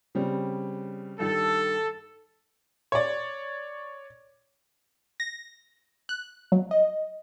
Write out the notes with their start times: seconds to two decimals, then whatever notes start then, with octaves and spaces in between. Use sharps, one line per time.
0.15 C#3 G3 C4
1.20 G2 D#3 A4
2.92 C#5 D5
5.20 A#6
6.09 F#6
6.52 F#3
6.71 D#5